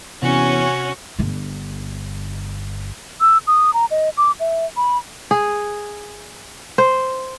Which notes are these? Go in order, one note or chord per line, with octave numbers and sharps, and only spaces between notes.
E2 C3 C#4 F#4
G1 D3
E6
D#6
A#5
D#5
D6
E5
B5
G#4
C5